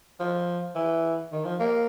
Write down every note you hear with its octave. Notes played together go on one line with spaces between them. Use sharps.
F3
E3
D#3
F3
A#3